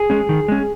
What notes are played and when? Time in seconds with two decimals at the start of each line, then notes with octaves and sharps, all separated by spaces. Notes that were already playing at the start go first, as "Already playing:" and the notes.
Already playing: G#4
0.10 G#3 C#4
0.29 D#3
0.48 G#3 C#4